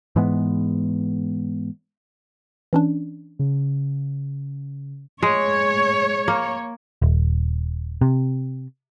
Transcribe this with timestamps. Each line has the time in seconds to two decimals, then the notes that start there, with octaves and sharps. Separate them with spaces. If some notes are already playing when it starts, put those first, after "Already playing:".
0.16 G#2 E3 G#3 B3
2.73 E3 C#4 D4
3.39 C#3
5.22 G#3 C#5
6.28 A#3
7.02 D#1
8.01 C3